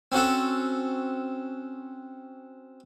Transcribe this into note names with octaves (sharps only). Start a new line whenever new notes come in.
C4 C#4 F#4 A4